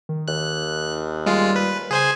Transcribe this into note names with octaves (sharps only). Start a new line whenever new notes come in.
D#3
D#2 F#6
G3 G#3 F4
B4
C#3 G#4 C5 G#5